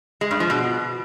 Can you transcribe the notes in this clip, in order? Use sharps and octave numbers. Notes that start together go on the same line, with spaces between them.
G#3
G2
F3
B2